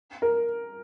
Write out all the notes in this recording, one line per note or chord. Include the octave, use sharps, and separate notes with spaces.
A#4